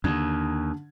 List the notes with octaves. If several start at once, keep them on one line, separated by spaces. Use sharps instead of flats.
D#2 D3 D4 G#6